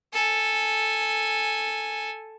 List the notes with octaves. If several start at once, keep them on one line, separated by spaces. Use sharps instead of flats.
A4 G#5